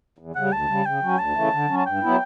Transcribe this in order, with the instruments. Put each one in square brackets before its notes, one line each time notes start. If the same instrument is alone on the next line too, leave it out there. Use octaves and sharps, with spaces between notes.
[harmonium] E2
[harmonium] C#3 G3 [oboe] F#5
[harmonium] D2 [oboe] A5
[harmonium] C#3 G3
[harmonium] C#3 [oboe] G5
[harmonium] F#3 C#4
[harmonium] D2 [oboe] A5
[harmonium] C#3 E3 A3
D3
F#3 C#4
[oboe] A5
[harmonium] G2 [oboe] G5
[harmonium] F#3 B3 E4